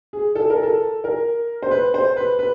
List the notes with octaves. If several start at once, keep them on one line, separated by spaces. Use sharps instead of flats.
G#4
A4
A#4
A4
A#4
C5
B4
C5
B4
B4